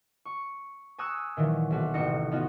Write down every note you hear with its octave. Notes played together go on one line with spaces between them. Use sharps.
C#6
G#5 A#5 C#6 D#6 E6 F#6
A#2 D#3 E3 F#3
B1 F#4
A1 C3 C4 D#4 A#6 C#7
B3 D#4 F4 F#4